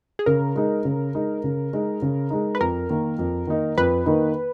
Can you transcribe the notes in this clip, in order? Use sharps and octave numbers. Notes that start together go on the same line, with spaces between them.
G#4
C#3 A#4
G#3 D#4
C#3
G#3 D#4
C#3
G#3 D#4
C#3
G#3 D#4
B4
F2 A#4
D#3 A#3 D#4
F2
D#3 A#3 D#4
F2 B4
D#3 A#3 D#4